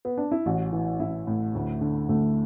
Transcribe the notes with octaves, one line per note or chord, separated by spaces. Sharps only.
B3
D4
E4
A1 F#4
E3
A1 E4
A2
D2
D3
D2 A3